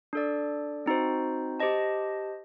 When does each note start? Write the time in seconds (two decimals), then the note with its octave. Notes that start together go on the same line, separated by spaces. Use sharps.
0.13 D4 A4 D5
0.86 C4 D#4 F#4 C5
1.60 G4 C5 D#5 A5